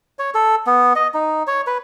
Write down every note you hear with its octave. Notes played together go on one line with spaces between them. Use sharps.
C#5
A4
B3
D#5
D#4
C#5
B4